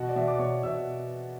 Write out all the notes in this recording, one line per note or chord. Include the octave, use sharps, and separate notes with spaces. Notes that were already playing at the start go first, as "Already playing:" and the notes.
Already playing: B2 F#4 F#5
D5
B2 E5
D6
B2 C#5 C#6
B2 E5 E6